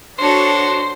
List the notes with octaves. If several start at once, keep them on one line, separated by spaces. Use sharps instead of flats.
D4 F#4 A4 C5 C#5